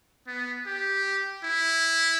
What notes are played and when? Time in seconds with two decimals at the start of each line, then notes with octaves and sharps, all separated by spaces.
0.27 B3
0.66 G4
1.44 E4